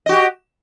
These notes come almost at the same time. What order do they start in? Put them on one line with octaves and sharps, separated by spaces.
D#5 F#4 G4